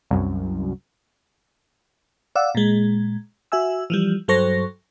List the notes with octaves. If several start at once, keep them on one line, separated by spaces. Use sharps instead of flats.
C2 F#2
D5 F5 F#5 E6
A#2 G#3
F#4 E5 G#5 E6
E3 F3 G3
G2 F#3 A4 C5 C#6 A#6